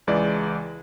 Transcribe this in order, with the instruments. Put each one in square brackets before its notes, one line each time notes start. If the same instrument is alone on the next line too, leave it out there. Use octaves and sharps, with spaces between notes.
[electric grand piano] C#2 E3 G#3 D5